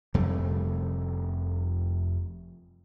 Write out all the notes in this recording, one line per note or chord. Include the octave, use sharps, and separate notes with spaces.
F1 F2 G3 A3